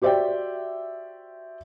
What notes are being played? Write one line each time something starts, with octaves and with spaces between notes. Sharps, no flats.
F#4 G4 C5 D5 E5 G5